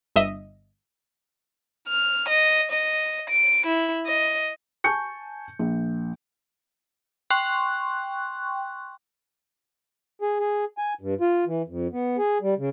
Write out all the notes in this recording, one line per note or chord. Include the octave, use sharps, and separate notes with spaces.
G1 D#5 E5
F6
D#5
D#5
D7
E4
D#5
G#5 A5 C#6 G6 C#7
A#1
G5 C6 C#6 F#6
G#4
G#4
G#5
G2
F4
E3
F2
B3
G#4
G3
C#3